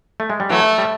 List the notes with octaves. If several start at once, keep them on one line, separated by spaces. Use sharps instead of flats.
A3
G#3
G3
E3 F#3 A3
G3